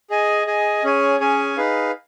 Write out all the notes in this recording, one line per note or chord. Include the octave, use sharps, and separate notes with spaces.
G#4 D#5 G#5
G#4 D#5 G#5
C#4 G#4 C#5 G#5
C#4 G#4 C#5 G#5
D#4 G#4 B4 F5